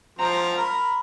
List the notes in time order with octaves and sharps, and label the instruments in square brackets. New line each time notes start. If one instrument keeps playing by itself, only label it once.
[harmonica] F3 C4 C5 [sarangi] A#5
[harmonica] A#4 B5